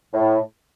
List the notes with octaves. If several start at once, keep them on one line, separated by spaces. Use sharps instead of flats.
A2